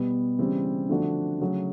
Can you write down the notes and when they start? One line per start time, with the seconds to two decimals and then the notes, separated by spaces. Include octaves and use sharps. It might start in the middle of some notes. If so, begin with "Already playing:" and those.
Already playing: B2 G3 B3
0.39 C#3 E3 G3 C4
0.89 D3 F3 A3 D4 F#4
1.41 C#3 F#3 A3 C#4 F#4